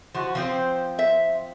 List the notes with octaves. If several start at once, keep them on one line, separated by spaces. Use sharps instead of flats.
F3 F#4
F3 C4 C5
E5